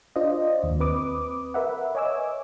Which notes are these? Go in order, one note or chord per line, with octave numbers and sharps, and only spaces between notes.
D4 F4 C5 D5 D#5
D#2
C4 B4 D6 D#6
A#4 B4 E5 F#5
C#5 D#5 G#5 D6 E6